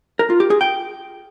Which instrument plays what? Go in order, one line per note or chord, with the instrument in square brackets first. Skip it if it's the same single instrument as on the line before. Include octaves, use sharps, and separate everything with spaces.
[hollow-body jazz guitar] A#4
F4
G4
G#4
G5